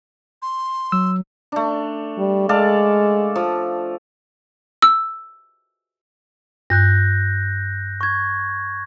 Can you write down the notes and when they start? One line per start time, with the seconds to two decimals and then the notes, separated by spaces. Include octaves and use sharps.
0.42 C6
0.92 F#3 E6
1.52 A3 D4
2.18 G3
2.49 G#3 A4 D5 F5
3.36 F3
4.82 E6
6.70 G2 F#6 G6 A#6
8.01 C#6 G#6